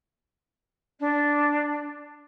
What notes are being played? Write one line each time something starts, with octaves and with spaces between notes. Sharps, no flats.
D4